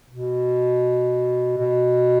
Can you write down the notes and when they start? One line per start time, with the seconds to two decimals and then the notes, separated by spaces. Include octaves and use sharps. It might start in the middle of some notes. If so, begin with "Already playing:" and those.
0.09 B2
1.58 B2